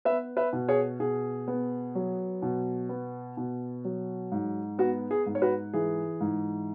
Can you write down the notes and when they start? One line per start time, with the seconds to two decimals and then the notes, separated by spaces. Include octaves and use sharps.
0.05 B3 B4 E5
0.37 B4 E5
0.53 B2
0.68 G#4 C#5
1.00 B2 G#4
1.48 B3
1.95 F#3
2.42 B2
2.89 B3
3.37 B2
3.84 F#3
4.32 G#2
4.78 B3 F#4
5.11 G#4
5.26 G#2
5.35 C#5
5.42 F#4 B4
5.73 E3 G#4
6.21 G#2